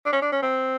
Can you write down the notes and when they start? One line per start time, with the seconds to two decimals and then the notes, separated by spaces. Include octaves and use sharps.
0.05 D4
0.12 C#4
0.22 D4
0.32 C#4
0.42 C4